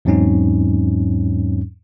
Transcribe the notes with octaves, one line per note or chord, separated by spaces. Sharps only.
E2 G#2 F#3 C4 C#4 D#4